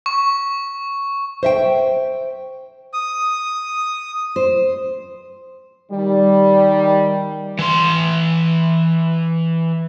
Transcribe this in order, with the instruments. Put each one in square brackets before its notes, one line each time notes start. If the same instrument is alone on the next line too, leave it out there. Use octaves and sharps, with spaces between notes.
[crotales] C#6
[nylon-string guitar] C5 E5 G5
[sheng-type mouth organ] D#6
[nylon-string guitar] C5
[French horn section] D#3 G3
[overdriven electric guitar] E3 C6